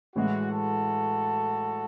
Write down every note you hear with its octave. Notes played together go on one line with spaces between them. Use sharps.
A2 E3 G#3 F#4
F#4 A4